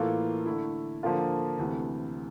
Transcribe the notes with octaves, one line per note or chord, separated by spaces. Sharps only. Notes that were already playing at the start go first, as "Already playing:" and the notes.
Already playing: A2 E3 A#3 F4 A4
D3 A3 E4
D3 F3 A#3 F4
D2 C3 E3